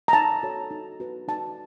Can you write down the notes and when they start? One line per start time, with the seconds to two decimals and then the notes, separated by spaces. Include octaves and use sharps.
0.08 A#5
0.13 D#4 A5
0.43 F#4 A4 C#5
0.71 D#4
1.00 F#4 B4
1.28 D#4 A5